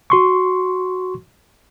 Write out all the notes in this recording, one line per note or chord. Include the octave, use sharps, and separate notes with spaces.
F#4 C6 C#6